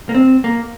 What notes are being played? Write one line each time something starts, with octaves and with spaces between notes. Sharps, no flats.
A#3
C4
A#3